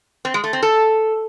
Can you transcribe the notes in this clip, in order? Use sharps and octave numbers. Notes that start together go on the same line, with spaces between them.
C4
G#3
A3
C4
A4